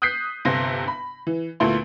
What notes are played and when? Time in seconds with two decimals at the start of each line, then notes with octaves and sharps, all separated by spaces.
0.02 D#6 F#6 G6 B6 C7
0.45 G1 G2 C3 C6 A#6
0.87 B5
1.27 E3
1.60 D2 A#2 A3 B3 E4 C6